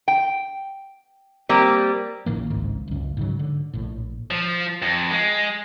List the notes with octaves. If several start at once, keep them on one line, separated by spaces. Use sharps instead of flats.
G5
G3 A#3 C4
A1 A2 D#3 A#3
G#1 C#2 G#2
F#1 C#2
G#2 C#3 F#3
D3
A#1 A2
F3
F2
G#3